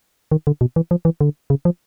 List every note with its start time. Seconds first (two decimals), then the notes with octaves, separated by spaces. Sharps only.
0.32 D#3
0.47 D3
0.61 B2
0.76 E3
0.91 F3
1.05 E3
1.21 D3
1.50 C#3
1.65 F3